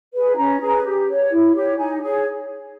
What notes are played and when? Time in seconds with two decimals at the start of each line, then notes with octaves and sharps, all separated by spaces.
0.13 G#4 B4
0.36 C#4 A#5
0.60 G#4 B4
0.84 G4
1.07 C#5
1.31 E4
1.54 G4 C#5
1.77 D#4 G#5
2.01 G#4 C#5